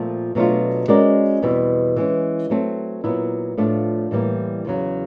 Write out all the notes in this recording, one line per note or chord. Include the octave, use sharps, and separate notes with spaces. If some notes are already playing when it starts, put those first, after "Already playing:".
Already playing: A#2 F3 A3 C4
B2 F#3 A3 D4 F4
G#3 C#4 F#4 A#4 D5
E2 B2 G3 C4 E4
E3 G#3 C#4
F#3 A3 C4
A#2 F#3 B3 E4
A2 F3 A3 D4 F4
A2 E3 G3 A#3
E2 C#3 F#3